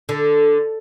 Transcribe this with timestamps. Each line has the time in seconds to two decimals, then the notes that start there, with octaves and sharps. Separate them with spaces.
0.09 D3